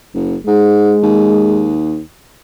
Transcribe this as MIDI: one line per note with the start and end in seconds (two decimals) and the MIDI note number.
0.14 0.36 30
0.47 0.96 44
0.47 1.75 56
1.03 2.00 39